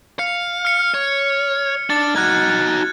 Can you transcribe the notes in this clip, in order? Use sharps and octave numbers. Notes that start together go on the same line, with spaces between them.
F5 C#7
F6 C#7
C#5
D4 A6
D#4 F#4 F#6 G#6